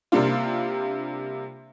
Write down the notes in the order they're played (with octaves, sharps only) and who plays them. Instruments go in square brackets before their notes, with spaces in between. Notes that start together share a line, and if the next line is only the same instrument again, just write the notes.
[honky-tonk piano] C3 G3 A#3 D4 F4